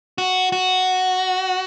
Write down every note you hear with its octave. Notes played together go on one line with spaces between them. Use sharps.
F#4
F#4